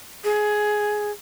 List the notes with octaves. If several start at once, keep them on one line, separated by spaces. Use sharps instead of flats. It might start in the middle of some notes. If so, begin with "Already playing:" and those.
G#4